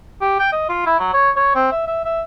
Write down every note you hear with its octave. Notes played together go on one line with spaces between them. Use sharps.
G4
G5
D#5
F4
E4
F#3
C#5
C#5
C4
E5
E5
E5